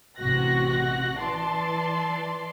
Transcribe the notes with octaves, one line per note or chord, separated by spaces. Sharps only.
A1 C3 F#4 F#6 A#6
E3 D5 A5 C6